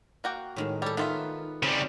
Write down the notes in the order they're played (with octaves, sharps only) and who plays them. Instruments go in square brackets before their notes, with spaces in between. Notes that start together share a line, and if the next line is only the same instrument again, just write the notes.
[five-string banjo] A#3 F#4 G5
[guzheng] A2 D#3 G#3
[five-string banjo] G3 [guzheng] A4 C#5
[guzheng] D#3 [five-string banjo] B3 F4 E5
[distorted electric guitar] C#3 G3 [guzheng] C4